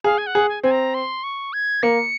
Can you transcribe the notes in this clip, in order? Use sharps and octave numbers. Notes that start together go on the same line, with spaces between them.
G#4 F5
G#5
F#5
G#4
G#5
C4 G#5
A#5
C6
C#6
G#6
A#3 C#7